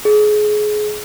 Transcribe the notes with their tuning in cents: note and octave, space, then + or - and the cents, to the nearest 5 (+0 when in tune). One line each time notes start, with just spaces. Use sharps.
G#4 +25